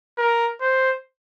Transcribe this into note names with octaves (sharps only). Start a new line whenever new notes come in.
A#4
C5